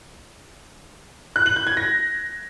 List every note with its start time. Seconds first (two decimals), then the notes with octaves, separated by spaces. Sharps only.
1.36 F#6
1.46 F#7
1.56 G6
1.67 G#6
1.77 A#6